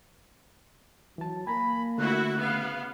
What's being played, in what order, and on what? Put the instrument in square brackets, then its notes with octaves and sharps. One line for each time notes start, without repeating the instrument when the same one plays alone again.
[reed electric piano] E3 A5 [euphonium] F#3
[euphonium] A#3 [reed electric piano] G#5 A#5 [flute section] B5
[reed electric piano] D3 A3 [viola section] E4 F#4 [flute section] F#6
[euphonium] C#3 [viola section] B3 F5